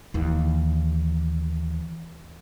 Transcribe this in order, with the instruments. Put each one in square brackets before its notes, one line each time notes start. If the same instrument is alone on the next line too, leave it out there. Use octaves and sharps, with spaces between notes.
[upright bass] D#2 E3